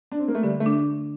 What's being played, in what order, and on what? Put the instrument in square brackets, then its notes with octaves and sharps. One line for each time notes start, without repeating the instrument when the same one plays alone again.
[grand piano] D4
C4
A#3
A3
[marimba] D3 [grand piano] G3
[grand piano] A3
[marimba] D4